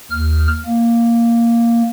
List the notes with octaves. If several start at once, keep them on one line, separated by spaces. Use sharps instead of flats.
D#2 F6
A#3